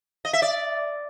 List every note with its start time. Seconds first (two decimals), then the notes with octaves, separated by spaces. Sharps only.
0.25 D#5
0.33 E5
0.42 D5